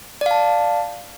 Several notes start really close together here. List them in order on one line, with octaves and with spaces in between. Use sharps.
D5 F5 A5